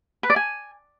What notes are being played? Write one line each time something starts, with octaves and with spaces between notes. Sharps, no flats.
B4
D5
G#5